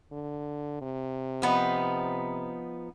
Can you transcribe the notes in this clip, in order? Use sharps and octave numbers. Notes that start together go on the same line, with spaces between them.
D3
C3
F3 B3 D#4